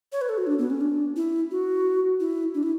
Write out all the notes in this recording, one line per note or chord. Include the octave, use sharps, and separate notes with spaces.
C#5
B4
A4
F#4
D4
B3
C#4
D4
E4
F#4
E4
D4
E4